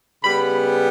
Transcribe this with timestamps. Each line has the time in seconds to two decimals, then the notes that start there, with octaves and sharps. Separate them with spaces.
0.23 C#3 G3 B3 B5